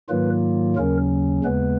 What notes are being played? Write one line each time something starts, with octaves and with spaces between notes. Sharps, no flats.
G#2 D#3 F#3 A#3 F4 B4
D#2 C#3 F#3 C#4 A#4
D#2 C#3 G#3 B3 B4